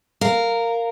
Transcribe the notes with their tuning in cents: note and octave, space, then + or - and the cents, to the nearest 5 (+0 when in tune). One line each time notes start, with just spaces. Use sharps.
A#4 -10 F5 +0